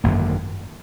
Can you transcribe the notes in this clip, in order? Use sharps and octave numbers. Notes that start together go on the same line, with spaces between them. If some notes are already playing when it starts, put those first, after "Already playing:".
G#1 F#2 D3 A#3